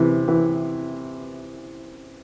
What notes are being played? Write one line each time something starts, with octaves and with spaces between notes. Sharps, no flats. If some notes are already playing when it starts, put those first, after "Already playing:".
Already playing: C3 E3
E3